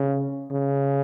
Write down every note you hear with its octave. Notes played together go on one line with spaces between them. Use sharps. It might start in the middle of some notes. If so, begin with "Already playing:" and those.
Already playing: C#3
C#3